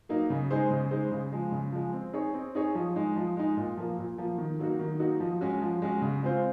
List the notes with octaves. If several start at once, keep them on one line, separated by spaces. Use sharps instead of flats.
F#3 A#3 D#4
C#3
G#3 D#4 G#4 C5
C#3
G#3 D#4 G#4 C5
C#3
F3 G#3
C#3
F3 G#3
C4
D#4 G#4 C#5
C4
D#4 G#4 C#5
F3
G#3 D#4
F3
G#3 D#4
A#2
F3 A#3
A#2
F3 A#3
D#3
F#3 A#3 D#4 F#4
D#3
F#3 A#3 D#4 F#4
F3
G#3 C#4 F#4
F3
G#3 C#4 F#4
C#3
G#3 C4 F4 C5